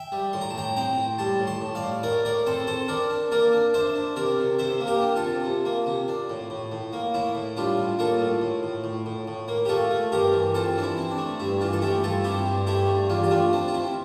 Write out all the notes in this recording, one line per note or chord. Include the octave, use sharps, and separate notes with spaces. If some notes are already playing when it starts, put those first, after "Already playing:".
Already playing: E5 G5
G3
A2 C6
A#5
A5
A2 G5 A#5
C4 G5 A#5
A2
G3 A5 C6
A2
A5 C6
A2
D5 F5
A2
A2 A#4 D5
A2 A#4 D5
C4 A4 C5
C4 A4 C5
D4 A#4 D5
D4
A#3 A#4 D5
D4
D4 C5 E5
D4
C3 A#4 D5
C3
C3 C5 E5
A#3
G4 A#4
D4
F4 A4
C3
C3
A#3
C3
D4
A2
A2
A2
A#3
A2 E4
A2
G3 D4 F4
A2
A#3 F4 A4
A2
A2
A2
A2
A2
A2
A#3
G4
A3 F4 A4
A3
G2 G4 A#4
E3
C4 F4 A4
E3 D4
E4
C4
D4
A3
G2 E4
E3 D4 F4
A4
A3 E4 G4
G2 F4 A4
C4 E4 G4
G2
A3 E4 G4
G2
E2 D4 F4
G4
A3 D4 F4
C4 D4
F4
C4 E4